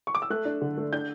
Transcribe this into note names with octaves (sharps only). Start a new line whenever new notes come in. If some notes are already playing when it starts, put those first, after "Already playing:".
C#6
D6
E6
A3 F#6
D4
D3
A3
D4 G6